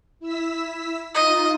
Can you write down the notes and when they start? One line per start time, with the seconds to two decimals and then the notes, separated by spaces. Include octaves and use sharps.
0.20 E4 E6 B6
1.14 D#4 F4 D#5